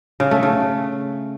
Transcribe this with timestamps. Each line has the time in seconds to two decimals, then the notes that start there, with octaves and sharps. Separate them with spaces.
0.20 C#3
0.31 A3
0.43 C#3